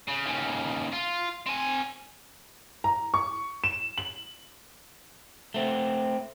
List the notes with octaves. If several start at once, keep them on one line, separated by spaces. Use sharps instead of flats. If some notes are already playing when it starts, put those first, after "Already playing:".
C#3
D#2 C#3
F4
C4 G#5
A#5
C#6
E7
F#7
A3 C4